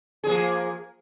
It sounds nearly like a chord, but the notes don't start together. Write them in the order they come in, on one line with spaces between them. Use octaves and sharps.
G#4 F3 A#3